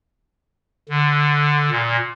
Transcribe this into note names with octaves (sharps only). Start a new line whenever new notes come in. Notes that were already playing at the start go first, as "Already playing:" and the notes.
D3
A#2